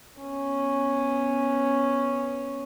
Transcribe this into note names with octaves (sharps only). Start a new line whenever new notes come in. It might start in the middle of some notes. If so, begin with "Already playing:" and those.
B3 C#4